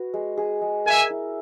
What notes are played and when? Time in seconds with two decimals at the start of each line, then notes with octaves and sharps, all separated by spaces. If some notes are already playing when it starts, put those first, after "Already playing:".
Already playing: F#4 B4
0.14 G#3
0.37 G#4
0.62 G#3
0.85 A#4 E5 G#5
1.10 E4